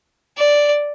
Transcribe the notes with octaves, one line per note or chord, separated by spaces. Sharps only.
D5